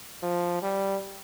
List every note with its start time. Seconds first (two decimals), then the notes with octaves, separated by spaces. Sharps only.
0.23 F3
0.62 G3